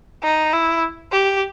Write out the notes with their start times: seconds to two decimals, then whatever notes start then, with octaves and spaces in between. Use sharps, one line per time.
0.23 D#4
0.53 E4
1.12 G4